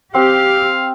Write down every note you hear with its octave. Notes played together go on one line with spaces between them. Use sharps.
C4 G4 F5